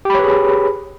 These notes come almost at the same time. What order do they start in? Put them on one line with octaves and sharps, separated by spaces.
G4 B5 C#5 B4 G#4